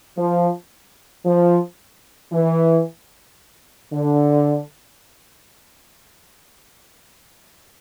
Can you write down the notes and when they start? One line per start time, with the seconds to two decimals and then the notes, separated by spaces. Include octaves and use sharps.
0.17 F3
1.26 F3
2.32 E3
3.93 D3